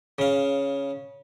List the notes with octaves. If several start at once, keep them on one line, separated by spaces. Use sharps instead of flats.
C#3 F5